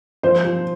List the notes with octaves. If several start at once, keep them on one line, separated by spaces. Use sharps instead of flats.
F3 C5
F3